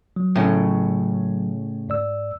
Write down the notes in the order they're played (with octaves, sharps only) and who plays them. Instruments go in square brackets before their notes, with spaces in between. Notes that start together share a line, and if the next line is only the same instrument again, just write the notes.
[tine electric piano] F#3
[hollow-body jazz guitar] A2 C#3
[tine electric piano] G#2 D5 E6